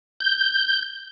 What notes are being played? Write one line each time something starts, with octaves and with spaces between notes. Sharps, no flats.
G6